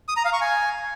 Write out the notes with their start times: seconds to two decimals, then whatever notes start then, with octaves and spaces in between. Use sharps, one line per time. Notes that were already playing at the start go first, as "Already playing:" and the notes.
0.08 D#6
0.17 A#5
0.25 F5
0.33 C#6
0.41 G#5